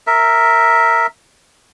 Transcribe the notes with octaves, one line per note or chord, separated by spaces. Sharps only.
A#4 E5